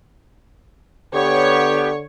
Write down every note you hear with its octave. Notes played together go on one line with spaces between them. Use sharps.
D3 B3 G4 C#5